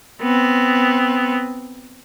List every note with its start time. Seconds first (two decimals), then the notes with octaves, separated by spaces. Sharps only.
0.22 B3 C4